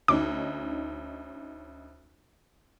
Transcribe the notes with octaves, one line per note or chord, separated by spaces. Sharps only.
D2 C#4 D#4 D6